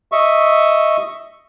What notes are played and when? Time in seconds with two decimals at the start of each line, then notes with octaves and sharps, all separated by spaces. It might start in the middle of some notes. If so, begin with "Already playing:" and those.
0.12 D#5 E5 C#6